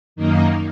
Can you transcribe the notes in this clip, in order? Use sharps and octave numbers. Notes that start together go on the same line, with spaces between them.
F#2 D#3 A#3 D#4